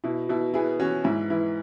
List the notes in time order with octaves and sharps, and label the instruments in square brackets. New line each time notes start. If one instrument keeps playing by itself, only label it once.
[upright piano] B2 E4
B2 E4
B3 E4 G#4
E3 C#4 F#4
G#2 E4
E3 E4